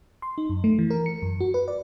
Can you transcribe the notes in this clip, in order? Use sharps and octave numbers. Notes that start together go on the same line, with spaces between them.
C6
D#4
F#2
A3
E3
A#4
C#7
F#2
F#4
B4
D5